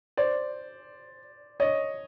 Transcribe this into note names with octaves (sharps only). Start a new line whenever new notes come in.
C5 D5
C#5 D#5